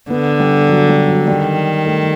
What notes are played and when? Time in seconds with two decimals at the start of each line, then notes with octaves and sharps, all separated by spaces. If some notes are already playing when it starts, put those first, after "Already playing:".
0.10 D3 B3
0.40 G3
0.69 F#3
0.89 G3
1.08 F#3
1.27 D#3 G3
1.86 A3